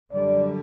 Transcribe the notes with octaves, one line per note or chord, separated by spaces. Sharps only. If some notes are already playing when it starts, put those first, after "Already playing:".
F#2 D3 G3 D5